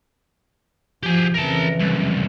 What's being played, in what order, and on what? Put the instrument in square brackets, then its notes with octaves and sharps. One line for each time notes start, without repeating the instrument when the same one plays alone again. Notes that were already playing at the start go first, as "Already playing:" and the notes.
[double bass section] F3 [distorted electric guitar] G4 G#4
[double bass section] F2 C#3 E3 [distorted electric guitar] A#4 A5
[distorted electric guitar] C2 F#2